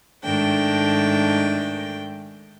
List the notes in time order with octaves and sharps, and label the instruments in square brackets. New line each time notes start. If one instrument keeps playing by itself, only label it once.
[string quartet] G#2 D#3 A3 D4 G5